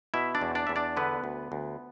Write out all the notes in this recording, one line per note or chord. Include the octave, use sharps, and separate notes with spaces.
B2 E4 E5
D4 D5
E2
D4 D5
E2 E5
D4 D5
D3 B3 B4
D2
D2